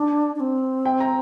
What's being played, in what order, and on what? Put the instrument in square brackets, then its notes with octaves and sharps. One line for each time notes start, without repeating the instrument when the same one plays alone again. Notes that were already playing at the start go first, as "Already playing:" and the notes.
Already playing: [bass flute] D4
D4
C4
[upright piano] G5
A#5